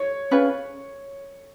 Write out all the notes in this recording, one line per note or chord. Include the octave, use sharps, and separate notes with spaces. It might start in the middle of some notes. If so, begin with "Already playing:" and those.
Already playing: C#5
C#4 F4 G#4 B4